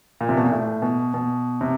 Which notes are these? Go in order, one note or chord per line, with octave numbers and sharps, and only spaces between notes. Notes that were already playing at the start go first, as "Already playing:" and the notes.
A#2
C3
B2
A#2
A2
B2
B2
C3